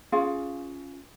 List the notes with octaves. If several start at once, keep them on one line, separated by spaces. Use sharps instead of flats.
C#4 F4 G#4 F5